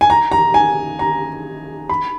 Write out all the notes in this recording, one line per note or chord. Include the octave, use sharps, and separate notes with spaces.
G#5
A#5
A#5
G#5
A#5
B5